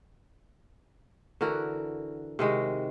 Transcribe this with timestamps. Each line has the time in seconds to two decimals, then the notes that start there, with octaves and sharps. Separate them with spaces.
1.41 D3 E3 F#4 A#4
2.39 C3 D#3 G#3 F#4